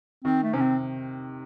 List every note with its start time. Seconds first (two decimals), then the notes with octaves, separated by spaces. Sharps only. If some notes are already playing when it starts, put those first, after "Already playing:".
0.24 D#3 C4
0.43 A3
0.53 C3 C#4
0.61 C4